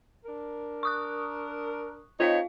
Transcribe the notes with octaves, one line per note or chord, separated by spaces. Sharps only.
D4 A#4
C#6 D#6 F#6
C4 D#4 F4 C#5 D#5 F5